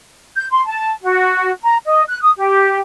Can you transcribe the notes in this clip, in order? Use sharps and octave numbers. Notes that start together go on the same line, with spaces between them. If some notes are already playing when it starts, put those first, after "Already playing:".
G6
C6
A5
F#4
A#5
D#5
F#6
D#6
G4